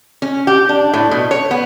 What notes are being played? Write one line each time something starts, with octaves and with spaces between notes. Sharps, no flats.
C#4
G4
D4
A2
B2
C#5
B3